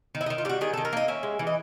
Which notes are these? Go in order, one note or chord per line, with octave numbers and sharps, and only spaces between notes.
D#3
E4
D#4
D#3
F4
G3 F#4 G4
D#3 G#4
A4
D#3
A#4
A#3 D#5
C#4 E5
G#3
E3
D#5